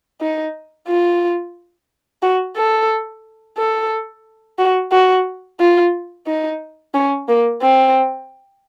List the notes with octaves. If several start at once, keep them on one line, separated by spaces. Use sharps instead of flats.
D#4
F4
F#4
A4
A4
F#4
F#4
F4
D#4
C#4
A#3
C4